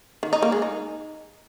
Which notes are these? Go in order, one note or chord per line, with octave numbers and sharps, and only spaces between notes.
D#3
D#4
A#3
G#3
D#4